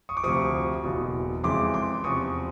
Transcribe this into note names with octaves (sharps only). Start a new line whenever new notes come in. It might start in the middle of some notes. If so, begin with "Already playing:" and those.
C#6 D#6
D6
D2 C3 F3 C#6 D#6
F#1 E2 B2
F2 C#3 E3 G#3 C6 D6
C6 D6
E2 C3 F3 C#6 D#6